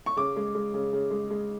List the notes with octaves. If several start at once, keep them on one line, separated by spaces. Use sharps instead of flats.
C#6
C#3 D6
G#3
G#3
C#3
C#3
G#3
G#3